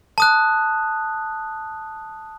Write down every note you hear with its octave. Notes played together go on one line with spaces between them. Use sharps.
A5 D#6 F#6